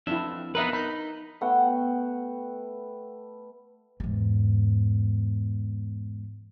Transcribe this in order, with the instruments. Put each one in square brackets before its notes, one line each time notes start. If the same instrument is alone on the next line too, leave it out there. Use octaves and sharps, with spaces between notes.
[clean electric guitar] F2 E5 [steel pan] D4 E4
[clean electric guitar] B3 D#4 B4 [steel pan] A#4 E5
[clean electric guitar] D#4 [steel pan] B5
[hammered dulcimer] A3 B3 F#5 G5
[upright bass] E2 G#2